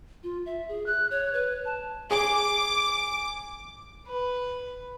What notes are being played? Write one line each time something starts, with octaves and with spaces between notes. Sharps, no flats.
F4
E5
G#4
F#6
C#5
B4
A5
G#4 D6
B4